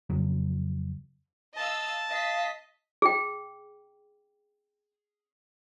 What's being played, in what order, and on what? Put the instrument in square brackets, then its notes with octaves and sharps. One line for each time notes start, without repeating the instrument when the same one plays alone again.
[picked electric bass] F2 C#3 F#3
[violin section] D#5 F5 E6 [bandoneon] A5
[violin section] D#5 B6 [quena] F5
[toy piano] G#4 G5